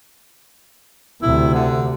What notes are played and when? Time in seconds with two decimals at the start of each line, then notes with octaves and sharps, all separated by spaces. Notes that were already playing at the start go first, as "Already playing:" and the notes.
1.22 D2 C3 E4
1.54 D3